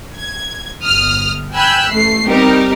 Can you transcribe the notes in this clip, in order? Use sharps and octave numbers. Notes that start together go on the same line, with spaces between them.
G#6
G1 D#6 F6
G5 G#5 B5 E6 F#6 G6
A1 A3 C7
G3 C4 D#4 G4 A#4